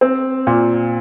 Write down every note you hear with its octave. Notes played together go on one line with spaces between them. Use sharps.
C4
A#2